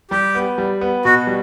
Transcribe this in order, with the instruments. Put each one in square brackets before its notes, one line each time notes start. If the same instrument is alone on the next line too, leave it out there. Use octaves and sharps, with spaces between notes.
[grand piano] G3 [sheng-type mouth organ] G4
[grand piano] B3
G3
B3
[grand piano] B2 [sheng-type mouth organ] F#4
[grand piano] G3